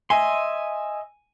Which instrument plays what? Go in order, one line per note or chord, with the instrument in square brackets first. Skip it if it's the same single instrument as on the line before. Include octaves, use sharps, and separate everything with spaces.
[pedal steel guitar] D#5 E5 C6 [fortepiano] G#5